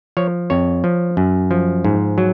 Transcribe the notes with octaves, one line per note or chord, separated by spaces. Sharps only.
F3 C#5
F2 C#5
F3
F#2
F3
G#2
F#3